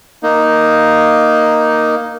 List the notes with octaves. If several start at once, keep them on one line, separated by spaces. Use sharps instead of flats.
A#3 D#4